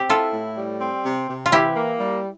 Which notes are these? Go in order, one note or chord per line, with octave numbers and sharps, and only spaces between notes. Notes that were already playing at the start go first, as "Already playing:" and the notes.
Already playing: C4 G4
E4 F4 A4
A2
G3
C4
C3
C3
F4
E3 E4 G4
A#3
G3